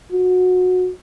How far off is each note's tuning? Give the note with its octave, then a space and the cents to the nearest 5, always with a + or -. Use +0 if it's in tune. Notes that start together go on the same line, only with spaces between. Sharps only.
F#4 -20